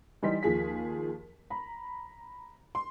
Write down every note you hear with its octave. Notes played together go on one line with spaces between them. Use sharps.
E3 G3 D#4 C6 B6
D#2 F3 G#4 B6
A#5 B5
C6